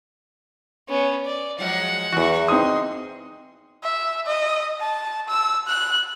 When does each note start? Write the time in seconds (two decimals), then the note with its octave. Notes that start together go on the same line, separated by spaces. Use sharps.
0.89 B3 C#4
1.26 D5
1.59 F3 F#3 G#3 F#5
2.13 E2 E3 F#4
2.48 C4 D#4 C6 D#6
3.83 E5
4.26 D#5
4.80 A5
5.28 E6
5.67 F#6